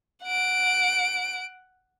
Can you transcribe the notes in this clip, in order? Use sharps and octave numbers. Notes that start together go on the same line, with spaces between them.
F#5 D7